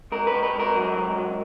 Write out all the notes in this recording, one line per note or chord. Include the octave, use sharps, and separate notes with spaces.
G#2 A#4
B4
G#2
B4
G#2
A#4
F#3
G#2
F#3